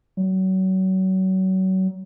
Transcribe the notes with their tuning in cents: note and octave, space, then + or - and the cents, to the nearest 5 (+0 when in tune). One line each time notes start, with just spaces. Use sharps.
F#3 +30